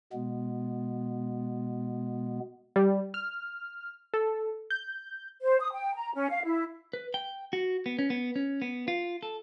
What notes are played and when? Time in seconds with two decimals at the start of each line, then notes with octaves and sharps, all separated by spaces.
0.13 B2 G#3 B3
2.76 G3
3.14 F6
4.14 A4
4.70 G6
5.42 C5
5.60 D#6
5.72 G5
5.95 A#5
6.14 C#4
6.30 F5
6.45 E4
6.93 B4
7.14 G5
7.53 F#4
7.86 B3
7.99 C#4
8.10 B3
8.36 C#4
8.62 B3
8.88 F4
9.23 A4